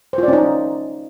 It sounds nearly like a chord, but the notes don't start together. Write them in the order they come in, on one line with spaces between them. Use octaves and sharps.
C5 F4 D5 C#4 D#4